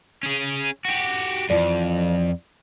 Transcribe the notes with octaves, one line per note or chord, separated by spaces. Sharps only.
C#4 G#4
F#4 G4
F2 E3 F3 D5